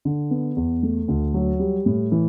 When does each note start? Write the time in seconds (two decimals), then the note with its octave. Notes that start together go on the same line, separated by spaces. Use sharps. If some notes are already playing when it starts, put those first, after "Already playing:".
0.05 D3
0.31 B3
0.57 E2
0.83 A3
1.08 D2
1.34 F#3
1.59 G3
1.86 A2
2.12 E3